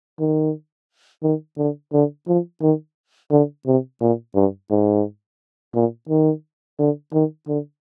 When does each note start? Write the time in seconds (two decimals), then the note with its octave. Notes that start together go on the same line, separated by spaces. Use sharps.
0.19 D#3
1.23 D#3
1.58 D3
1.93 D3
2.28 F3
2.62 D#3
3.31 D3
3.66 C3
4.01 A#2
4.35 G2
4.70 G#2
5.74 A#2
6.09 D#3
6.79 D3
7.13 D#3
7.48 D3